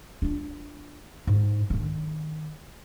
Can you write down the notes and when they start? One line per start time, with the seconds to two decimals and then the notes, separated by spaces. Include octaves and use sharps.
0.22 D4 F4
1.27 G#2 E4
1.70 D3 D#3